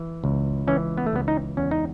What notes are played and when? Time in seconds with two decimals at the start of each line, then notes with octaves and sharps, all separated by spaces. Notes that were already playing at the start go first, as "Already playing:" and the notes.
Already playing: E3
0.24 C#2
0.67 E3 C#4
0.98 B3
1.06 A3
1.13 C#2 B3
1.28 D#4
1.57 E2 C#4
1.71 D#4